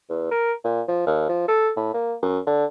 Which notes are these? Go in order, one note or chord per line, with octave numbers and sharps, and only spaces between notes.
E2
A#4
A#2
F3
D#2
F3
A4
A2
A#3
F#2
D3